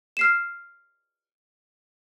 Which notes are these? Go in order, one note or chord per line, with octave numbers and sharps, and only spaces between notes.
F6 C7 E7